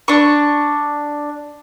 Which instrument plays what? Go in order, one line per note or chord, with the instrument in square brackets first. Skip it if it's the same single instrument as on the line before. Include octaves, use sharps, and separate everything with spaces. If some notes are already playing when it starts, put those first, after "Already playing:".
[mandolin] D4 C#6